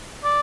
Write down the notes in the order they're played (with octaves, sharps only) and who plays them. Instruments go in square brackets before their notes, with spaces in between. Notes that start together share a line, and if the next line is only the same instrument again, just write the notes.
[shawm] D5